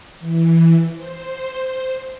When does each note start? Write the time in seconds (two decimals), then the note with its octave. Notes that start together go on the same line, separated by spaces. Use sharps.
0.20 E3
0.94 C5